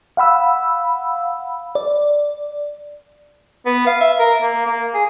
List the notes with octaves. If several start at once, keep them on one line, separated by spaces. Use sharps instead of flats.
F5 F#5 B5 E6
D5
B3
F5
E5
A#4
A#3
A#3
G#4